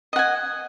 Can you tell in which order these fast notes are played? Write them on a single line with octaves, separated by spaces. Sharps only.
D#5 F#5 G#5